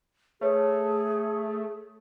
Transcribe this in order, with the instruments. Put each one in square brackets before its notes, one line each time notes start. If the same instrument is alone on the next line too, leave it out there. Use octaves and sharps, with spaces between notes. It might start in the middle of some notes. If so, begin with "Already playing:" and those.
[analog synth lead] A3 [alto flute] G#4 [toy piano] B4 C#5